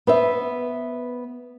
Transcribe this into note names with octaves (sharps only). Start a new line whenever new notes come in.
B3 C5 E5